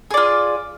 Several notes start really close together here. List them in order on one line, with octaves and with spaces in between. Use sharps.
G#4 D5 F4